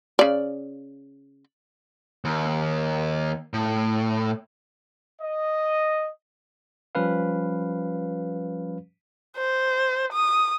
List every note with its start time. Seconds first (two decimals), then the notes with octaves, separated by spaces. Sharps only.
0.19 C#3 D5
2.25 D#2
3.54 A2
5.21 D#5
6.95 F3 G3 C#4 B4 F5
9.37 C5
10.13 D#6